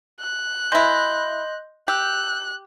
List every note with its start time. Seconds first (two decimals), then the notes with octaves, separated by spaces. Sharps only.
0.21 F#6
0.72 E3 E4 D#5 C6 G6
1.88 G4 E6 F#6 G6